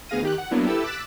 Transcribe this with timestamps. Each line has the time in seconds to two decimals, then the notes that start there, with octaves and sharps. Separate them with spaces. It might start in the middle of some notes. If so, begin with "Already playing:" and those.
0.09 D2 B3 G#4 F5 A#6 D#7
0.23 D#3 G4 F#6
0.38 F#5
0.51 F#3 A#3 B3 D4 E4
0.66 E4 G4 A4 B4 E6
0.84 D6 E6 F#6 A6 B6 E7